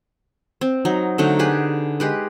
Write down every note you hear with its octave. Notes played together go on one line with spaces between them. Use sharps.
C4
F#3 D#4
D3 F#3 A3 D#4
G4 G#4 B4
G#3 G4 B4